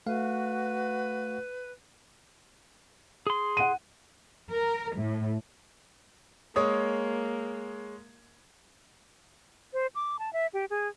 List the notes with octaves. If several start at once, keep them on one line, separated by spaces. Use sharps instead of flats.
A3 F#4 B4 F5
G#4 C6
F#5 D#7
A#4
A2
G#3 A#3 C#5 D#6
C5
D6
A5
E5
G4
G#4